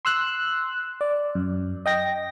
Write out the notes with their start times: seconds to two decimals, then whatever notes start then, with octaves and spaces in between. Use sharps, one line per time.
0.05 C6 E6 F#6
1.01 D5
1.35 F#2
1.86 D#5 G5 A#6